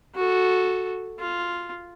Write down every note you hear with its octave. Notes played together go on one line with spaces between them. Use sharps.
F#4 A4
F4